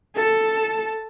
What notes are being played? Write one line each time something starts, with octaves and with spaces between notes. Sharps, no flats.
A4 A5